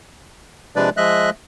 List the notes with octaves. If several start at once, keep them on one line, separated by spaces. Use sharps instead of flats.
C3 F3 G#3 D4 B4 D5
F3 G#3 D#5 E5 F#6